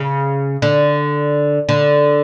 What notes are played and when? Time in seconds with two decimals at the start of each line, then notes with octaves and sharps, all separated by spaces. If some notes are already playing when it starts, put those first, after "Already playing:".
Already playing: C#3
0.62 D3
1.69 D3